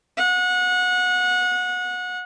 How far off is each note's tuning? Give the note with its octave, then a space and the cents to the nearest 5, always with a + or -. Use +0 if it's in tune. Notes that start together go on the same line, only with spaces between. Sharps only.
F#5 -25